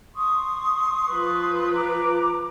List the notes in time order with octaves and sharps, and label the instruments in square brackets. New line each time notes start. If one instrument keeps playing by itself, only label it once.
[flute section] C6 C#6 D#6
[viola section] F3 F4 B4
[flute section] A#5 D6